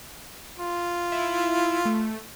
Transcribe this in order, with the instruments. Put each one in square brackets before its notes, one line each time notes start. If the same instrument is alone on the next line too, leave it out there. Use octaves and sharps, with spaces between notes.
[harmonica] F4
[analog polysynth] E4
A3